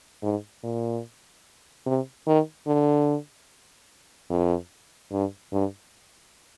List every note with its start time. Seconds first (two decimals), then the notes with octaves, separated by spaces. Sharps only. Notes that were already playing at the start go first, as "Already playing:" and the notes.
0.23 G#2
0.63 A#2
1.86 C3
2.27 D#3
2.67 D3
4.30 F2
5.12 G2
5.52 G2